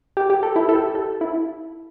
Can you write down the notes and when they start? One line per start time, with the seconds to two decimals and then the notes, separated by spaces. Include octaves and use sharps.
0.17 G4
0.30 G4
0.43 A4
0.56 E4
0.69 A4
0.75 G4
0.95 A4
1.21 E4